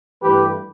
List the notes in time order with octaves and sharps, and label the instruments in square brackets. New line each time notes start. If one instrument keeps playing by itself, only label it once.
[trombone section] G2 E3 A3 G4 B4